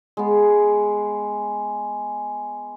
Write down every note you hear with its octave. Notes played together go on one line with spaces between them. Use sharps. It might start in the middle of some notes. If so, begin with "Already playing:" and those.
G#3 B3